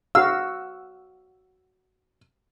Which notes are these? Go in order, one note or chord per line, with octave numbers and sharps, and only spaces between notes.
F#4 F5 E6